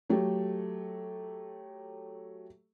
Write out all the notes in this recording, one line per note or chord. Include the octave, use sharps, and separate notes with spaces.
F#3 A3 G4 A4